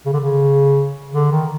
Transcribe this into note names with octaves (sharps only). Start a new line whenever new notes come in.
C#3
D3
C#3
D3
D#3